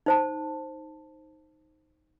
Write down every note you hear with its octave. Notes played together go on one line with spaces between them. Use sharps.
D#4 C5 A5